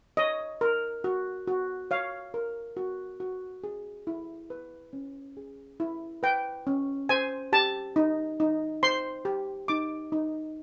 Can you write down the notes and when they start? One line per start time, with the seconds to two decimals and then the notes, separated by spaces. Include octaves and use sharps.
0.17 C#5 D#5
0.61 A#4
1.04 F#4
1.47 F#4
1.91 C#5 F5
2.34 A#4
2.77 F#4
3.20 F#4
3.64 G#4
4.07 E4
4.50 B4
4.93 C#4
5.37 G#4
5.80 E4
6.23 B4 G5
6.67 C#4
7.09 C5 G#5
7.53 G4 A5
7.96 D#4
8.40 D#4
8.83 C5 C6
9.25 G4
9.68 D#4 D6
10.12 D#4